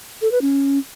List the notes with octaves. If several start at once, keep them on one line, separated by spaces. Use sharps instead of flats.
A4
B4
C#4